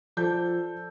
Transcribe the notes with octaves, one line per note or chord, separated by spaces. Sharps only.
F3 A4 C5 D5 G6